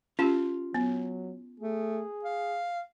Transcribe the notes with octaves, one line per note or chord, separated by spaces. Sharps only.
C#4 F4 G4 A5
F#3 B3
A3 G#4
F5